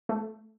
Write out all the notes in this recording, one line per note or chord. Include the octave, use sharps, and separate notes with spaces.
A3